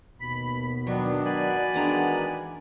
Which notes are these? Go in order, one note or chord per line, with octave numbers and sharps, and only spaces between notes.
D#2 B2 B5
D#3 F#3 B3 D4
F#4 D5 F#5 G#5 B5
D#3 E3 G#3 B3 D4 A#5